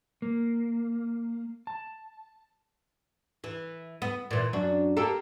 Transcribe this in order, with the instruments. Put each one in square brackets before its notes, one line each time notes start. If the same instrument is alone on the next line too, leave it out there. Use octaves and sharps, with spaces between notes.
[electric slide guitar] A#3
A5
[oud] E3
B3
A#2 E3
F#2 D4 F#4
A#3 G4 A4